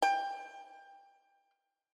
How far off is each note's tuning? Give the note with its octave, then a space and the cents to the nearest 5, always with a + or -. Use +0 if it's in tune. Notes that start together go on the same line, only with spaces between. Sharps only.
G5 +20